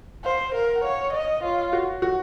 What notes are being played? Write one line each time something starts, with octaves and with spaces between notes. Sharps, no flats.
C5 F5
A#4 F5
F#5
C#5 F5
D#5
F4 C#5
F#4
F#4